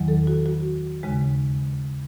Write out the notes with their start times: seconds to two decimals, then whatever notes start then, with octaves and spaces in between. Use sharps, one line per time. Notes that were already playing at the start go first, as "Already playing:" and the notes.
Already playing: E2 D#3 F#3
0.08 A4
0.27 F#4
0.46 F#4
1.03 D#2 C#3 G#3